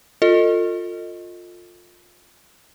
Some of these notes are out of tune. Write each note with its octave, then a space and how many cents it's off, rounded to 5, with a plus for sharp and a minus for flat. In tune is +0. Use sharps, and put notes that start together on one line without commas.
F4 +20 A4 +35 D#5 -5